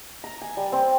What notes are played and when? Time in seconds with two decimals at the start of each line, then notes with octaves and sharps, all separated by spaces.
0.24 A#5
0.42 G#5
0.57 G3
0.72 C4